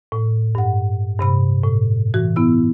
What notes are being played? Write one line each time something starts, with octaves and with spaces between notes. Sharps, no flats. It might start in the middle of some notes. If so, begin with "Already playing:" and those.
A2
G2 F#5
G2 C3 B5
A2
E3 F#4
B3 E4 E6